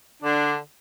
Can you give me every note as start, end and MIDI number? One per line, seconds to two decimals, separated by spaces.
0.22 0.57 50
0.22 0.57 62